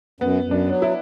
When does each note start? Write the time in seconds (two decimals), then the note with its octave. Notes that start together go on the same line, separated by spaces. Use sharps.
0.21 F#2 B3
0.44 F#2
0.51 D4
0.67 F#3
0.82 E4